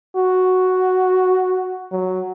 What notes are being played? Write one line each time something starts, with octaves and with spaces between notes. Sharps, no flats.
F#4
F#3